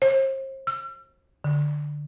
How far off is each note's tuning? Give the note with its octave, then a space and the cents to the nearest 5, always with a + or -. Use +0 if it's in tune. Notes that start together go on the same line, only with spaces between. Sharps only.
C5 +40
E6 +45
D3 +5